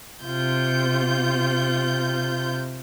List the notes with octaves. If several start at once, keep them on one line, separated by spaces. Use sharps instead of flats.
C3 F4 G6